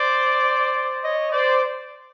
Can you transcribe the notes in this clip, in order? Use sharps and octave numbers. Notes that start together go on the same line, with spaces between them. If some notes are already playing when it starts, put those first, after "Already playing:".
Already playing: C5 D5
C#5 D#5
C5 D5